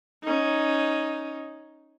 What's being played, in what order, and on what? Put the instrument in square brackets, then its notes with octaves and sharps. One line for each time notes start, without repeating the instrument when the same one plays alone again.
[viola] C#4 D#4